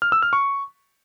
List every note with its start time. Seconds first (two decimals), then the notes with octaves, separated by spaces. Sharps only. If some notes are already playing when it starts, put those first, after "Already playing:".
0.02 F6
0.12 E6
0.22 F6
0.33 C#6